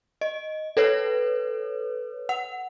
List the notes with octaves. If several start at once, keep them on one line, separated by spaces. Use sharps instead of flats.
D#5
A4 B4 C#5
F#5